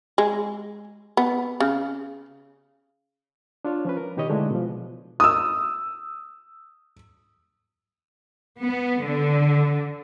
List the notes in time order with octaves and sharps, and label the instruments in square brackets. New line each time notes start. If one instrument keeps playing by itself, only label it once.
[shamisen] G#3
B3
C#3
[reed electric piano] D4 F4 C#5
F3 C#4 B4
A#4
B2 D#3 G4 B4 C#5 D#5
D3 G#3 A3 D4 E4
B2 F3
[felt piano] D#6 E6
[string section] B3
D3